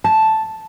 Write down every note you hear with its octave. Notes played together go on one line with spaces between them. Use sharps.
A5